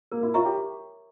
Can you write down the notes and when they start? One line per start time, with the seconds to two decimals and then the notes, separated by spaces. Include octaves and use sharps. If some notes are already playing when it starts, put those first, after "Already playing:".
0.12 A#3 A#4
0.23 E4
0.34 F4 C#5 E5 A#5 C#6
0.45 G4